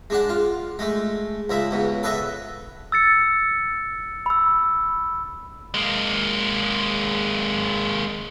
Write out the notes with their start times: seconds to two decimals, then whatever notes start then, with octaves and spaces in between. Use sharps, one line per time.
0.10 G#3 D4 F#5
0.29 F4
0.79 G#3 A3
1.50 C#2 G#3 E5
1.71 C#2 B2
2.03 A4 B4 C#5 D#5 E5
2.92 E6 A6 C#7
4.26 B5 E6
5.74 G#3 A#3